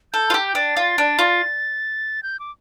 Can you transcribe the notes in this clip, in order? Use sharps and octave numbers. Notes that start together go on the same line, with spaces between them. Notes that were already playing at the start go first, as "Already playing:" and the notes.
A4 G6
F4
G4
G6
D4 A6
F4
D4
F4
G6
D6